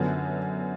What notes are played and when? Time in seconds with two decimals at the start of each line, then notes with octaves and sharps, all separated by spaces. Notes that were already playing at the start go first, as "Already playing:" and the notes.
Already playing: F#2 D3 F#3 B3